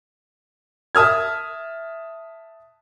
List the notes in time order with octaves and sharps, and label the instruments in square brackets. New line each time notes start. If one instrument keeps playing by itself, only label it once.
[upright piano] E5 A5 D#6 F6 G#6